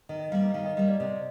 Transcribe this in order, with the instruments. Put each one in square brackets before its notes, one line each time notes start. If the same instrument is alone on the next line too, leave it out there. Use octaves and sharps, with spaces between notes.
[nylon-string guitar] D#3 [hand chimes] D#5
[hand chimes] D#5
[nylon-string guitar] G3 A#3 [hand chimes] F5
[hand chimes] D#5
[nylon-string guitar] D#3 [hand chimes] F5
[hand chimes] D#5
[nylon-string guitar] G3 A#3 [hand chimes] D#5
[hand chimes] D5
[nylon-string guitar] C3 [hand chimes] D#5